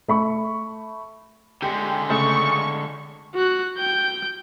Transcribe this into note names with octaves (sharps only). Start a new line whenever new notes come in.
A3 B5 C#6
D3 G#3 G4
C#3 A3 C#6
F#4 F#6
G5 G6